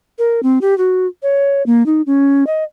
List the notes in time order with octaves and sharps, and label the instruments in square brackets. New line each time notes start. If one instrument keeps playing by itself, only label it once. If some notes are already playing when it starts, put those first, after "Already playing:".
[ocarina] A#4
C4
G4
F#4
C#5
A#3
D#4
C#4
D#5